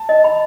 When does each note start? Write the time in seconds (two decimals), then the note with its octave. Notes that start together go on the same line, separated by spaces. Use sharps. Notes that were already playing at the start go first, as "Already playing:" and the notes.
Already playing: A5
0.09 D#5
0.24 B5